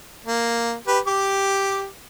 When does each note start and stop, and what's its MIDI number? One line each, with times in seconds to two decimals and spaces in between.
0.25 0.75 58
0.87 0.99 67
0.87 0.99 71
1.07 1.86 67
1.07 1.86 86